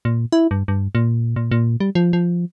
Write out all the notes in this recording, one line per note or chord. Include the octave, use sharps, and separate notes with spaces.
A#2
E4
G2
G2
A#2
A#2
A#2
G3
F3
F3